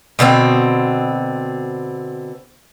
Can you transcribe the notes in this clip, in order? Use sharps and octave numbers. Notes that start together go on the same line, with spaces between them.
B2 D3 A3 C4